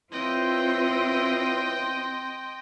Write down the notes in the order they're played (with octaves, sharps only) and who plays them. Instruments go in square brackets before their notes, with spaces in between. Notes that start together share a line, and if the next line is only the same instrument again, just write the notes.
[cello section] C4 F4 [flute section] E4 B4 C#5 [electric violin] D#5 G5 [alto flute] C6